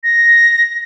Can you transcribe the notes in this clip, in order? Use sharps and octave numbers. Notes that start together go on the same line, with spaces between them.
A#6